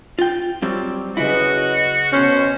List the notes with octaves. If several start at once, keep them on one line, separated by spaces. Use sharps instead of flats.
F4 G5
F#3 G3 C4
C#3 F#3 E4 F#4 B4 D#5
B2 C#4 C5